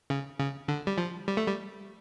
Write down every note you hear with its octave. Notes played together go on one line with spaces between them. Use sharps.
C#3
C#3
D3
G3
F3
G3
A3
G3